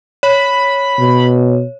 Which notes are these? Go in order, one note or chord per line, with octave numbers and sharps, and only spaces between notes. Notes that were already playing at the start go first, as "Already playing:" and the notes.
C#5 B5
B2